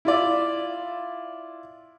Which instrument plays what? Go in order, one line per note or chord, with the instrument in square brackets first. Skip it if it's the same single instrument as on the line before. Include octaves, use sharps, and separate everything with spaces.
[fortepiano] E4 F4 D5 E5